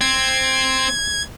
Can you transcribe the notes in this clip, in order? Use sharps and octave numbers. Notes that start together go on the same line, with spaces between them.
C4 G#6